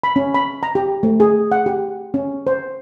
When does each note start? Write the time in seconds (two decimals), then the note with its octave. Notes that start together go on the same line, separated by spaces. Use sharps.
0.04 B5
0.16 C#4
0.34 B5
0.63 A#5
0.75 G4
1.03 A3
1.20 G#4
1.52 F#5
1.66 G4
2.14 C#4
2.47 C5